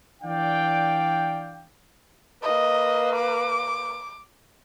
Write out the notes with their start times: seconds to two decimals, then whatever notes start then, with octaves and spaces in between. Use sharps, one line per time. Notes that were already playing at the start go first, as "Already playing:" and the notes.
0.23 E3 D4 D5 F5 G5
2.43 A#3 B4 D#5
3.16 D6